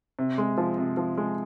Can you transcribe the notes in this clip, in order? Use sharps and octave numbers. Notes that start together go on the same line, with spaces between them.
C3
G#3
F3
C3
F3
G#3